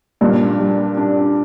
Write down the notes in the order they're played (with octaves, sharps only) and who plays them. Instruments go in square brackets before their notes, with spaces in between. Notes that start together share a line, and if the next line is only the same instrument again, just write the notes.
[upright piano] G2 A#2 [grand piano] D4
[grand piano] G3
D4